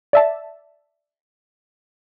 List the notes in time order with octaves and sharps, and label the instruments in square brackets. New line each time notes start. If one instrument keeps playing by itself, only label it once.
[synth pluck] D5 E5 A5